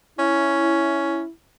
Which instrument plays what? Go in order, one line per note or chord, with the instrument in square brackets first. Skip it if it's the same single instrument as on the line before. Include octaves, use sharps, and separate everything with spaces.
[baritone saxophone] C#4 [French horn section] E4